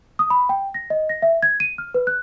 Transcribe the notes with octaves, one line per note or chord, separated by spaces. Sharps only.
D#6
B5
G5
A#6
D#5
A#6
E5
G#6
D#7
F6
B4
F#6